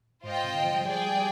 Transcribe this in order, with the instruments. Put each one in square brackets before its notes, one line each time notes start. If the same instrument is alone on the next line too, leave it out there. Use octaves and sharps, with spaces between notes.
[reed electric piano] G#2 [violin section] F4 C5 D#5 G5
[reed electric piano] C3
D3
F3
G3
[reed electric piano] F3 [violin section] G#4 D5 G5
[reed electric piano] G3
G3
G3